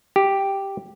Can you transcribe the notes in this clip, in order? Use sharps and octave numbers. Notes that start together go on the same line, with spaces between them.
G4